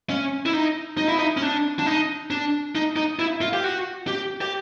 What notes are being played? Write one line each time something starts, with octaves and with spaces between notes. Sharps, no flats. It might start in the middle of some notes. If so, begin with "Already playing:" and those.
C#4
E4
D#4
D#4
E4
D#4
C#4
D4
D4
D#4
D4
D#4
D#4
E4
F4
G4
F#4
G4
G4